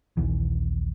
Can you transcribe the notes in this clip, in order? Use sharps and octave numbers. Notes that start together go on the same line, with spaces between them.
A#1 D#2 E3